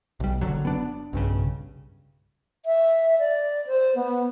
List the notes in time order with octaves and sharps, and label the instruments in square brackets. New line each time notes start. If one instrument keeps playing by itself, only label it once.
[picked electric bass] B1 G3
F#1 D3 F#3
B3 D4
B1 G2 C#3
[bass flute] E5
D5
C5
B3